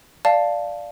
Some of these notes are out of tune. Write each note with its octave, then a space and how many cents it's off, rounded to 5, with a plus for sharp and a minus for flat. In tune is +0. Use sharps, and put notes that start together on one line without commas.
D5 +0 F5 +0 A5 +0